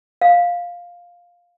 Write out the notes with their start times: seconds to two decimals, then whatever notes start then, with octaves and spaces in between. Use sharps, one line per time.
0.21 F5